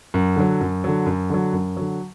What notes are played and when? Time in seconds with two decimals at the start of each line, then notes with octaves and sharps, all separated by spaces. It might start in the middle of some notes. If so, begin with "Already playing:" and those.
0.14 F#2
0.36 D3 F#3
0.61 F#2
0.84 D3 F#3
1.06 F#2
1.30 D3 F#3
1.53 F#2
1.77 D3 F#3